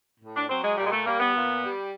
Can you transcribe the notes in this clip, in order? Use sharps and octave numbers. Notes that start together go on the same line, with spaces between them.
A2
D4
F#3 C4
G#3
A#2 G3
G#3
A3
G3 A#3
B3
A#2
G3